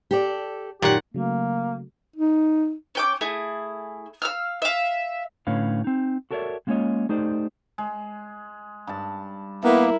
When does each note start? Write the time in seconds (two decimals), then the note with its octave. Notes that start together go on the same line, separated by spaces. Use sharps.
0.11 G4 A4 D5
0.82 F#2 A#2 D#3 G4 C#5 F#5
1.14 C#3 F#3 A3 A#3
2.16 D#4
2.95 C#4 G5 D6
3.21 A3 E4 G#4
4.22 F5 E6 F6
4.62 E5 F5
5.47 A2 D3 C#4 B4 C#5 F5
5.84 C4 D#4
6.31 F#4 A4 A#4 C#5 D5 E5
6.67 G#3 A#3 C#4 F4 C#5 D#5
7.09 A3 D#4 G4 C5 D5
7.78 G#3
8.87 G2 A5
9.64 A#3 B3 E4 A#4